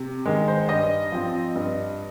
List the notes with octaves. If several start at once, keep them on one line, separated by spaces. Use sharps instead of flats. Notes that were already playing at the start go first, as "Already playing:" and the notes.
Already playing: C3
D#3 G#3
C5
G2 D#5
F3 C4
G2